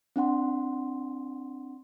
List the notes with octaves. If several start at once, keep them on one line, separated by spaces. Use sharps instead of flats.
C4 D4 F#5 C6